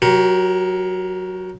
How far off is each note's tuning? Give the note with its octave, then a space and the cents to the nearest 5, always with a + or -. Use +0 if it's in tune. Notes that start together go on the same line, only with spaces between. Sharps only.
F#3 -5 G4 -30 A#4 +15